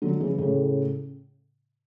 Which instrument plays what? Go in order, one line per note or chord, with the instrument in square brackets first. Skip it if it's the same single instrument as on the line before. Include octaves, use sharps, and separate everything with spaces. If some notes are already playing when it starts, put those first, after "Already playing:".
[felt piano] D3 F#3
C#3 E3
A2 C#3